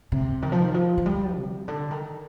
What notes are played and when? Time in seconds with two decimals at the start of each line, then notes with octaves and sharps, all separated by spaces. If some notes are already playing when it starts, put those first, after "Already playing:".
0.12 C3
0.42 D#3
0.52 F3
0.60 D#3
0.74 F3
0.98 F3
1.06 G3
1.36 C3
1.68 D3
1.91 D#3